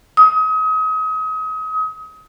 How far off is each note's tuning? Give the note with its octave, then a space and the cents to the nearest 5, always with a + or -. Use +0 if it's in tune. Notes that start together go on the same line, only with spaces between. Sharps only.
D#6 +35